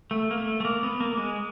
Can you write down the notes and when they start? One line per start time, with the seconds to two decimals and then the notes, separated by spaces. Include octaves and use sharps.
0.11 A3
0.31 A#3
0.38 A3
0.60 A3
0.65 A#3
0.83 B3
1.00 A#3
1.17 G#3